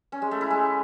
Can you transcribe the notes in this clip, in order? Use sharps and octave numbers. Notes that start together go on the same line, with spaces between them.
C#4
G#3
A3
E4
G#3